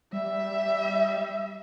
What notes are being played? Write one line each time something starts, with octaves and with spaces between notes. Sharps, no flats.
G3 E5